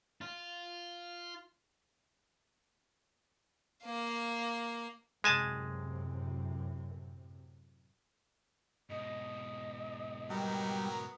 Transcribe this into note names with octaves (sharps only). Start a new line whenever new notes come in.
F4
A#3 F5
F#2 A2 C3 G#3 G#5 A5
G#2 B2 D#5
F#3 G3 B3 A#4